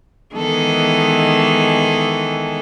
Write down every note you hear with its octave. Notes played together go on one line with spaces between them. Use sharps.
D#3 E3 G#3 B3 G#4 A4